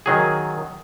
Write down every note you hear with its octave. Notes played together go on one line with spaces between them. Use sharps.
D#3 F#3 G#4